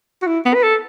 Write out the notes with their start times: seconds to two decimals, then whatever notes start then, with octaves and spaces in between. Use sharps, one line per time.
0.22 F#4
0.27 E4
0.45 B3
0.54 B4
0.63 A4